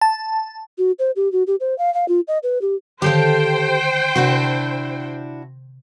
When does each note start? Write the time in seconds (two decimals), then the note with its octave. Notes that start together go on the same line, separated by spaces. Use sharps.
0.01 A5
0.78 F#4
0.99 C5
1.16 G4
1.32 F#4
1.47 G4
1.60 C5
1.78 F5
1.94 F5
2.08 F4
2.28 D#5
2.43 B4
2.61 G4
3.02 D3 D#3 G4 A4 C5 F5 G5
4.16 C3 D4 E4 F#4 F#5